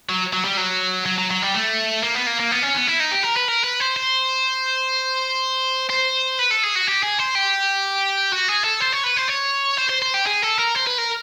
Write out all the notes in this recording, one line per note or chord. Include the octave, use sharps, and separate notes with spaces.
F#3
F#3
G3
F#3
F#3
F#3
F#3
G3
A3
A#3
B3
A#3
A#3
B3
C#4
B3
E4
D#4
G4
A#4
B4
A#4
B4
C5
C5
C5
B4
A4
G#4
F#4
G4
G#4
C5
G4
F#4
G#4
A4
C5
C#5
B4
C5
C#5
C5
C5
C5
G4
G#4
A4
A#4
C5
B4
A#4